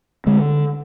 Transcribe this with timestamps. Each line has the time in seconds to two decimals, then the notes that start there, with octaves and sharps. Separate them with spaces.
0.26 D3 G#3